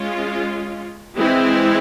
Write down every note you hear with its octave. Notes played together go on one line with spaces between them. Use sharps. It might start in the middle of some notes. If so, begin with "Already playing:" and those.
Already playing: G#3 C#4 F4
E3 G#3 C4 E4